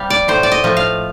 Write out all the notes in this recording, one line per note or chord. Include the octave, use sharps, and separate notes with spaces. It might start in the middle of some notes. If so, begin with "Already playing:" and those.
Already playing: C3 G3 F5
D5
A2 C5
D5
D#5
F3 A3
F5